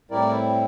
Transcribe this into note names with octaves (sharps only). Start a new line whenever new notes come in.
A2 G3 C4 E4 A#4 D5